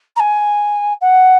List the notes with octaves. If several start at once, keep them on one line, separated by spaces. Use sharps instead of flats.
A#5
G#5
F#5